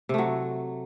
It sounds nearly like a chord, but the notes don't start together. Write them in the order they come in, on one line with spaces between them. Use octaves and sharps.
C3 A3 F#3